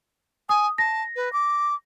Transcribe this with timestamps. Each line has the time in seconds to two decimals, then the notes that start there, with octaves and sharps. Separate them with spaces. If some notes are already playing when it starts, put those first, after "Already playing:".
0.49 G#5 D#6
0.78 A5 A#6
1.16 B4
1.33 D6